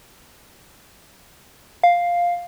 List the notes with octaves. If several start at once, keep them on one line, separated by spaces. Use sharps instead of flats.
F5